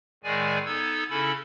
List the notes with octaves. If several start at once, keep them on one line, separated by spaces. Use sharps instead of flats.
A2 D#3 G#3 G#4 D5 G#5
B3 D#4 A4 E6 G#6
C#3 C#4 E4 A4 B5 E6